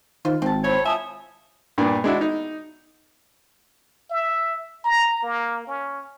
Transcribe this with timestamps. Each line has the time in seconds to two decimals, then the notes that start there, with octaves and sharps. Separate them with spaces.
0.25 D#3 F4 C5
0.42 G#1 C4 A5
0.64 A3 C4 E4 C5 C#5 B5
0.85 F4 E5 G#5 A5 D#6
1.78 G2 A#2 D4
2.04 G#3 D4 E4 F#4
2.21 D#4
4.10 E5
4.85 A#5
5.23 A#3
5.67 C#4